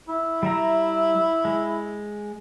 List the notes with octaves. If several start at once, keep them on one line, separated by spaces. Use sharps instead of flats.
E4
G3 E5 A#5
G#3